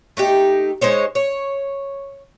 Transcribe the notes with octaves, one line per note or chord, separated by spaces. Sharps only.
A3 D#4 G4
G#3 D#4 C5 C#5
C#5